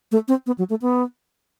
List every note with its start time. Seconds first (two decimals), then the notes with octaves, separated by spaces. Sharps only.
0.12 A3
0.28 C4
0.47 B3
0.58 F#3
0.70 A3
0.82 B3